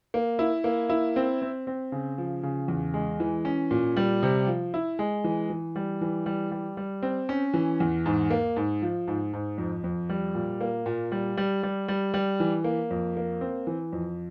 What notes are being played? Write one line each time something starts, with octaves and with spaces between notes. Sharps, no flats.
A#3
E4
A#3
E4
C4
C4
C4
C#3
F3
C#3
E2
G#3
E3
C#4
A#2
G3
C3
F3
E4
G#3
E3
E3
G3
E3
G3
G3
G3
C4
C#4
E3
E2
G#2
A#3
G#2
F3
G#2
G#2
F2
F2
G3
A#2
A#3
A#2
G3
G3
G3
G3
G3
E3
A#3
F2
A#3
C4
E3
F2